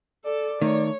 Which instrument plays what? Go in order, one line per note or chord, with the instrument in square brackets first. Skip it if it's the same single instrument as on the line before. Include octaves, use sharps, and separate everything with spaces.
[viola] A4 [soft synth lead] D5
[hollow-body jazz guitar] D#3 [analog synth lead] A3 [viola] C#5